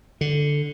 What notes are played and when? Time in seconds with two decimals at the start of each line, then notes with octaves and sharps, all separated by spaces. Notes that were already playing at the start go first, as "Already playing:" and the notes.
0.21 D3